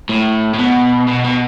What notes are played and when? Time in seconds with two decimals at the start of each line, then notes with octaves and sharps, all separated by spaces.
0.09 A2
0.54 A2
0.59 B2
1.08 B2
1.25 B2